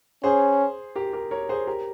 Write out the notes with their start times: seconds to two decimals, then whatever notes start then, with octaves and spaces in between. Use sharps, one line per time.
0.23 C#4 G#4 C5
0.96 G4 A#4
1.13 G4 A#4
1.31 A#4 C#5
1.49 G#4 C5
1.67 G4 A#4